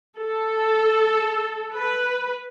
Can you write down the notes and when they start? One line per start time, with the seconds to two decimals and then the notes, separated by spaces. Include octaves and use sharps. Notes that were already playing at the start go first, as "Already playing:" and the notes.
0.17 A4
1.73 B4